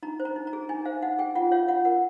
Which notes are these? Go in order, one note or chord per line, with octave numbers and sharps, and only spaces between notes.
D#4 A#5
C5
A#5
D#4
A#5
G#4
D#4 G#5
C5 F5
D#4 F#5
G#4 G5
F4 F#5
C#5 F5
F4 F#5
A#4 F#5